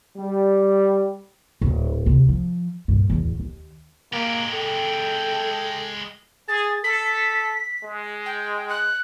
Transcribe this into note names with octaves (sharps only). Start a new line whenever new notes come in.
G3
D1 A#2
D2 C3
F3
G2 A#2
D1 E2
D#2
G#3 A#3 G4
A4 G5
G#4 A6
A4 B6
G#3
G5
F#6